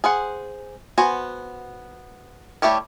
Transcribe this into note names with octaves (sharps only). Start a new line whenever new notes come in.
G#4 C5 F#5
B3 F#4 C5 G#5
G3 A3 E4 G4 C#5